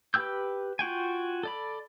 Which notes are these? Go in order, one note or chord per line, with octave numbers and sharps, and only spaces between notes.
G4 B4 G5 E6 G6
F4 F#4 G5 G#5
A4 D5 B5